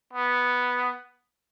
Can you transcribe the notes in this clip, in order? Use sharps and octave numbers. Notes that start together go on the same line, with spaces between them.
B3